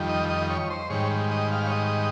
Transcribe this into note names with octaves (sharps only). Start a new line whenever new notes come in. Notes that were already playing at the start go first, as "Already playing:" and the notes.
Already playing: F2 D#3 G3
D#5
D#5
C#5
C5
G#2 D#3 G3 C#5
D#5
F5
C#5
D#5